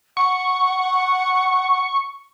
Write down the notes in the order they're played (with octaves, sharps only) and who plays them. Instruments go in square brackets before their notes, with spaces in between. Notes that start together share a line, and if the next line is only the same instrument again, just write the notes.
[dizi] F#5 [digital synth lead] C#6